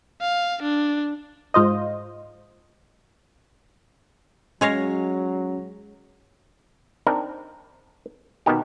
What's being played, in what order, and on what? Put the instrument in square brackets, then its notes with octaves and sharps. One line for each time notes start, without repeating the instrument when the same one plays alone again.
[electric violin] F5
D4
[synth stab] G#2 F4 C5 D#5
[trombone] F#3 [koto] G#3 C#5 F5 [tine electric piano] C#4 A#6
[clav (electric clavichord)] C4 D4 D#4 A#4
B2 D#3 B3 D#4 G4